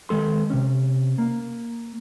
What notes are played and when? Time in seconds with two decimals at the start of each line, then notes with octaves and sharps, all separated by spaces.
0.09 D#3 G#3 A4 C6
0.50 C3 C#4
1.18 A#3